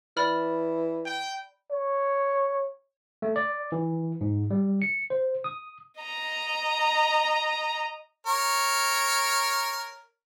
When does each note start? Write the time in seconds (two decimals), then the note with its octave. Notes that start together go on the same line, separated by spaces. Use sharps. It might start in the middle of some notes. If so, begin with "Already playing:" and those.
0.17 E3 D5 B5 F6
1.06 G5
1.71 C#5
3.22 A3
3.36 D5
3.72 E3
4.21 G#2
4.51 G3
4.82 C#7
5.10 C5
5.44 D#6
6.01 D#5 A#5
8.27 A#4 C#5